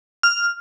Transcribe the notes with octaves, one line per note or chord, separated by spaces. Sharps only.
F6